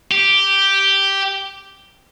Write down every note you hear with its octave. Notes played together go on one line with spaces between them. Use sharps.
G4